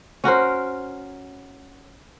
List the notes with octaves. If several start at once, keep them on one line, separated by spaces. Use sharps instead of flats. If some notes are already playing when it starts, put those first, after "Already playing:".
C#4 F#4 A#4 C5